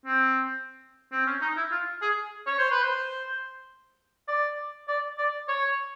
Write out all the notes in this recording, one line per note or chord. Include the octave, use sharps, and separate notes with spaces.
C4
C4
C#4
D#4
E4
F4
G#4
C#5
C5
B4
C5
D5
D5
D5
C#5